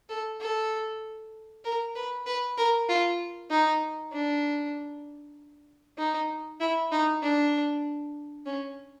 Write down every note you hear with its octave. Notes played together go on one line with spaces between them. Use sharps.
A4
A4
A#4
B4
B4
A#4
F4
D#4
D4
D#4
E4
D#4
D4
C#4